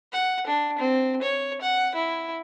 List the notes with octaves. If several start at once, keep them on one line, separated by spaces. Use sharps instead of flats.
F#5
D4
C4
C#5
F#5
E4